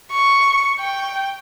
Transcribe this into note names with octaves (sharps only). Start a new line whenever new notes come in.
C#6
G5